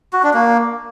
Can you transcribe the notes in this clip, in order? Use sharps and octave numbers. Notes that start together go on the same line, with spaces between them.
F#4
D4
A#3